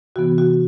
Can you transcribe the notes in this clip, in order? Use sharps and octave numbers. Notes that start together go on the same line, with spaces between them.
C3 E3 B3 F#4
F#4